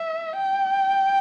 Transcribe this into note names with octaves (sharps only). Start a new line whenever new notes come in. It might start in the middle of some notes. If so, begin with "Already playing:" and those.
Already playing: E5
G5